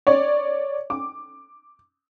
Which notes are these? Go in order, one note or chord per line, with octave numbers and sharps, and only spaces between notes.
C#5 D5
D6